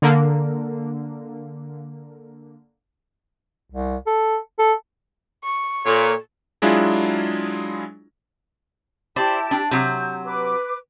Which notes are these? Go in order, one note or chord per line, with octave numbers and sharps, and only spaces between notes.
D3 A#3
C2
A4
A4
C#6
A#2 A4 C#5
F#3 G#3 D4 E4 F4 G#4
E4 G4 C5 D5 A5
D4
C3 F#3 G6
B4 D6